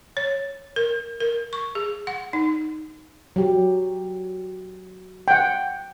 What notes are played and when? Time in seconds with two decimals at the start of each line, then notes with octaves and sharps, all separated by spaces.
0.17 C#5
0.76 A#4
1.20 A#4
1.53 C#6
1.75 G#4
2.07 F#5
2.33 D#4
3.36 F#3 G4
5.28 F#5 G5